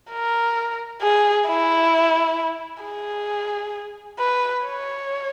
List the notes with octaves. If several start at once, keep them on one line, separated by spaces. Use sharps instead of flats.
A#4
G#4
E4
G#4
B4
C#5